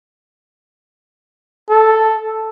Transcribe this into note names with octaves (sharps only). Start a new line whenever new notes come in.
A4